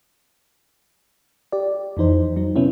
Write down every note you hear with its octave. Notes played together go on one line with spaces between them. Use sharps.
G4 D5
F2 E3 D#4 C5
F#3 D#4
C3 B3 C#4 E4